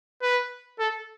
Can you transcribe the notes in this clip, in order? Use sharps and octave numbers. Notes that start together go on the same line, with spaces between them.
B4
A4